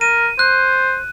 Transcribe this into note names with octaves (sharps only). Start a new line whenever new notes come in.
A#4 D#7
C5 F#6